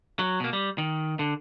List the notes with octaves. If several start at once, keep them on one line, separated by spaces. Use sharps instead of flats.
F#3
B2 A#3
G3
D#3
D3